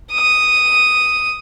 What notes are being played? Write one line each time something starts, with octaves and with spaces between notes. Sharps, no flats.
D#6